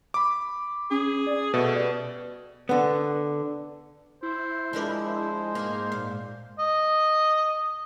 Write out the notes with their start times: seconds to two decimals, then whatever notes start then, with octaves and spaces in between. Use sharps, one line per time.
0.14 B5 D6
0.91 C#4 G#4
1.26 D5
1.54 B2 A3 B4
1.75 G3
2.69 D3 B3
4.23 E4 C5
4.73 F3 G#3 D4 A#4
5.04 C5
5.55 G#2 A#3
5.92 A#2 F5
6.59 D#5